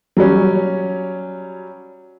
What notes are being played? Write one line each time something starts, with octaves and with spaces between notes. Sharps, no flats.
F#3 G3 C#4